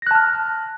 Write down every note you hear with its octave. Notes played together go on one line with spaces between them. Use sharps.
A5 F6 F#6 A#6